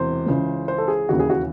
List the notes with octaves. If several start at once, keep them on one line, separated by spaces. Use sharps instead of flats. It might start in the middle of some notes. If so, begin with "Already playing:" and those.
Already playing: E1 E2 C3 C5
C#2 C#3 E3
C5
A4
G#4
E1 D#2 C#3 E3 F#4
G#4
F#4